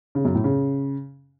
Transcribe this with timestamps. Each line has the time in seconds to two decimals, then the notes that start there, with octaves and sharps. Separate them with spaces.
0.15 C#3
0.25 F#2
0.34 A2
0.44 C#3